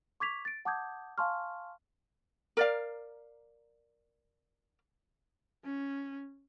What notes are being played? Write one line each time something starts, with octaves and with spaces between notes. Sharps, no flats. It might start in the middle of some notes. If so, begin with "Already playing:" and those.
C#6 D6 G#6 B6 F7
A6 D7
F#5 A5 D6 D#6 G6 G#6
F5 G#5 A5 C6 C#6 F6
A#4 D5 F5
C#4